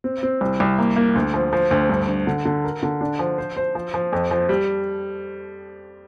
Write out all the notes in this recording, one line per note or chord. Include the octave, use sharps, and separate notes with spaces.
C4
C4
C2
C2
A#3
A#3
D2
F3
F3
D2
G2
G2
D3
D3
A#4
D3
D4
F3
C5
C5
F3
F3
F2
F3
G3